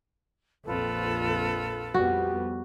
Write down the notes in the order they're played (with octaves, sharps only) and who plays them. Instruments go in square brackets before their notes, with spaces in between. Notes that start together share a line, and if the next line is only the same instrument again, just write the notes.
[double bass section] A#1 F2 [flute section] F4 A4 B4
[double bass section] F2 G3 B3 [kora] F#4